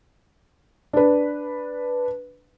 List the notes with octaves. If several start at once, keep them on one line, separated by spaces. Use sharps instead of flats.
D4 B4